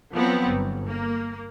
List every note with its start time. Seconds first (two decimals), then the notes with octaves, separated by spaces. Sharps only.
0.14 F3 F#3 B3 C4
0.50 G1
0.89 A#3